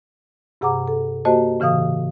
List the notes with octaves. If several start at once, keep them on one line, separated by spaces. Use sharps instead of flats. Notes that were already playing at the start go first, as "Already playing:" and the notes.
G2 C3 G#4 F#5 A#5 D6
A4
A#3 F#4 G4 C5 D#5 A5
A2 C#3 E3 F5 D#6